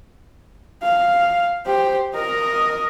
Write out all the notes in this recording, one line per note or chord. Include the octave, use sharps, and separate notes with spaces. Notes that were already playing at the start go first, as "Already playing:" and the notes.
F5
G4 C5
A#4 D#5